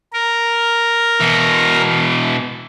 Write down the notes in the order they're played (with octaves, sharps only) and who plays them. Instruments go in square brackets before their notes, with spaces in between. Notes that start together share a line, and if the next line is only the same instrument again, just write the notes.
[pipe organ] A#4
[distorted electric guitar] B2 E3